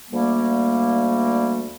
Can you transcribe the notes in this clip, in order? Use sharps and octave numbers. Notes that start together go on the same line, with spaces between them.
D2 G3 A3 A#3